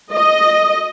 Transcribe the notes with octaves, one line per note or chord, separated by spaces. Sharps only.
D#5